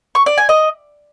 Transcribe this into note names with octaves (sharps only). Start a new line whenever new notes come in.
C#6
D5
G#5
D#5